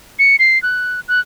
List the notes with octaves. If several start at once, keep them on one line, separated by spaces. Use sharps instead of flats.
C#7
C7
F#6
F#6